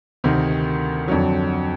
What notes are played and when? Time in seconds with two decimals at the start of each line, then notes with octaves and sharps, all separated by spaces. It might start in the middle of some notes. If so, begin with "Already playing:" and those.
0.24 D2 C3 D#3
1.08 F2 D3 F#3